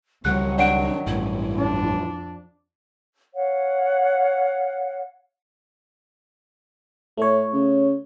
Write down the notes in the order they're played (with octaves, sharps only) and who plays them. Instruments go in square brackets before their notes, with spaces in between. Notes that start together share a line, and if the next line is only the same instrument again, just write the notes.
[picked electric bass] C#2 G3 [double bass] D#3 F#3 [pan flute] F#5 [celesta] F#6
[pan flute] D4 [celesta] D5 F#5 D7
[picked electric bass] A1 G2 [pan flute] E4
[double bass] F2 D4
[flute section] C#5 F5 F#5
[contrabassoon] A2 [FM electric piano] A3 C#5
[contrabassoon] C#3